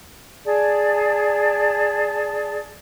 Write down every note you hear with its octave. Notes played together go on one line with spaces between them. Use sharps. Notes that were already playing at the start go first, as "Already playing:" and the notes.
G#4 D5 A5